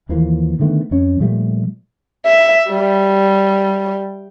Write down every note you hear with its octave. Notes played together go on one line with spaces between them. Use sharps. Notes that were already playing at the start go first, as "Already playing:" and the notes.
D#2 E3 F3 A#3
D3 D#3 A3 B3
F2 C#4
A#2 F3 G3 A3
E5
G3